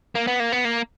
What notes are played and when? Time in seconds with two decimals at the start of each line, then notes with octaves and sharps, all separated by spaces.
0.15 A#3
0.27 B3
0.40 A#3
0.52 B3
0.65 A#3